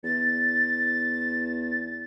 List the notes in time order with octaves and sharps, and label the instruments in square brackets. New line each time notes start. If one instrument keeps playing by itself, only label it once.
[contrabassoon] E2 [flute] A6